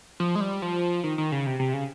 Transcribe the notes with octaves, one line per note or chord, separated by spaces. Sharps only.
F3
G#3
G3
F3
D#3
D#3
C#3
C3
C3
C#3